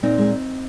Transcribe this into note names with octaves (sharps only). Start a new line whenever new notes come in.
A#2 C4 D#4
G#3